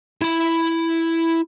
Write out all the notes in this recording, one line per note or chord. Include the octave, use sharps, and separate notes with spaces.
E4 B5